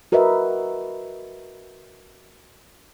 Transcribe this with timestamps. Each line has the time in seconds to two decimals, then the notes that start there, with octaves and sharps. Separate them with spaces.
0.12 F#4 A#4 B4 D#5 E5